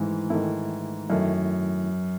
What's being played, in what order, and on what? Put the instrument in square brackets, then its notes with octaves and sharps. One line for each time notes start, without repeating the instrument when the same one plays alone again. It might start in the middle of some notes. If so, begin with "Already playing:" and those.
Already playing: [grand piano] G#2 E3 [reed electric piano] D#3 A3 E4
[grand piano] G#2 [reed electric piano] D#3 A3 E4
[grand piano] F#2 [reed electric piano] D#3 A3 E4